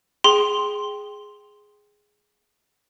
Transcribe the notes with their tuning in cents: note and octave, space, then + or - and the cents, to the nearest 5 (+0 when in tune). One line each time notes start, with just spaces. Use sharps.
G#4 +0 G5 +0 C6 +0